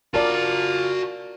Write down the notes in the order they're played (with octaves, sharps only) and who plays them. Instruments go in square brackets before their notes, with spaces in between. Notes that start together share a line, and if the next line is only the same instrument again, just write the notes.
[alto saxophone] F4 [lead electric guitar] F#4 A5 [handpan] A#4 D5